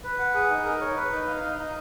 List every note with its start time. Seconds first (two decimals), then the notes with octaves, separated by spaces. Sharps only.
0.04 B4
0.19 F#5
0.34 G#4
0.50 D#4
0.65 A#4
0.81 C#5
0.96 B4
1.12 D#4
1.27 F5
1.43 D#4
1.58 D#4